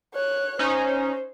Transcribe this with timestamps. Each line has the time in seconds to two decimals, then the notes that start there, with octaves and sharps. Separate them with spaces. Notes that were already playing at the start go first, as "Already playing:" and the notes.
0.14 C#5 F#6
0.59 C#4 D#4 C5